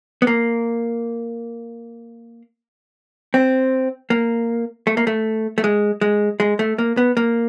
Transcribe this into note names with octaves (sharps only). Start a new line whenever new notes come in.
B3
A#3
C4
A#3
A3
A#3
A3
A3
G#3
G#3
G#3
A3
A#3
B3
A#3